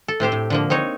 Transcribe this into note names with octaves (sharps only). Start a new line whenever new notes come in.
A4
A2 C4 G4 C5
A2
D3 F3 A#3
C4 D#4 C#5